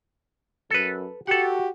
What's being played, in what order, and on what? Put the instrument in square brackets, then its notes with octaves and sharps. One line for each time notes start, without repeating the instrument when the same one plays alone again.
[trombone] F#2 [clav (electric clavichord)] A4 B4
[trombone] F#4 [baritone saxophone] G4 [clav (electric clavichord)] A4 F#5